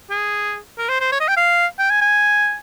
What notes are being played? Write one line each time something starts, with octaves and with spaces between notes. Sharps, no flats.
G#4
A#4
C5
C5
C#5
D#5
G5
F5
G5
G#5
G#5